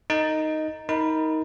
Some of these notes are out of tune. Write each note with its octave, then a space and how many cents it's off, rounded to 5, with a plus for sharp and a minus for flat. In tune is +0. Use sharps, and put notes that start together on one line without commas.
D#4 +0 A4 +30
D#4 +20 A#4 -5 B5 +5